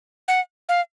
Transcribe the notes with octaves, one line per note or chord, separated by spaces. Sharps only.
F#5
F5